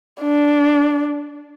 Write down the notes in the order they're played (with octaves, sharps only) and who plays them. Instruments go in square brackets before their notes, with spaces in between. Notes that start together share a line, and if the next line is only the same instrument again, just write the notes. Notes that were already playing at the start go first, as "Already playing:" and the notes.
[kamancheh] D4